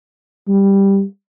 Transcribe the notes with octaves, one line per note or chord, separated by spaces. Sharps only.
G3